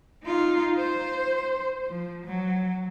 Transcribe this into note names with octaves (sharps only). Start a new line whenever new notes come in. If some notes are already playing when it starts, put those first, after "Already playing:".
D#4 F4
C5
F3
F#3